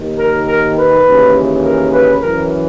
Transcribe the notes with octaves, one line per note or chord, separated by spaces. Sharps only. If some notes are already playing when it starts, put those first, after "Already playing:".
Already playing: D#2 D#3
A#4
A#4
B4
D#2 C#3 E3
A#4
B4
F#2 E3 A#4